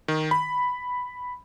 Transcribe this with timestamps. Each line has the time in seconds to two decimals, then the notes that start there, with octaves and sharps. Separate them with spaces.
0.08 D#3
0.31 B5